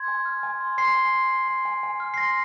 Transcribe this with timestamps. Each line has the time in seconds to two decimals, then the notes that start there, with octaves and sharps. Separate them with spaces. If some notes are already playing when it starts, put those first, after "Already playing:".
Already playing: C6 G#6
0.08 G#5
0.26 F6
0.43 G#5
0.60 C6
0.78 G#5 C6 C7
0.95 G#5
1.13 C6
1.31 C6
1.48 C6
1.65 G#5
1.83 G#5
2.00 F6
2.14 C7
2.17 C6 A#6